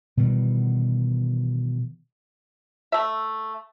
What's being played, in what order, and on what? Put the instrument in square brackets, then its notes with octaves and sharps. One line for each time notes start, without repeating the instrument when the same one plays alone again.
[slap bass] B2 D#3 E3 G3
[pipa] A3 E5